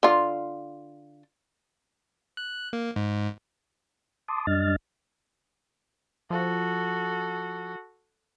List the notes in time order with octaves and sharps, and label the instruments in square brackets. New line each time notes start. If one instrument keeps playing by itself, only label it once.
[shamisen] D3 F4
[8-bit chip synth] F#6
A#3
G#2
[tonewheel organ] A5 C6 D6 D#6
F#2 G3 D4 D#5 F6 A6
[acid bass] F3 [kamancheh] F#4 A4